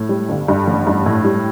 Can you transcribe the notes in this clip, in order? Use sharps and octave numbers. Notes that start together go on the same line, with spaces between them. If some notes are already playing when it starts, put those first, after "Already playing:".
Already playing: A2
G3
G1
G2
A1
G2
A2
G3